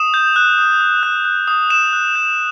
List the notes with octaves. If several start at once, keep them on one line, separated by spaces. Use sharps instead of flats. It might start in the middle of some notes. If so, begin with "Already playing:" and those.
Already playing: D#6 E7
G6
F#6
D#6
D#6
F#6
F#6
D#6
F#6 E7
F#6
G6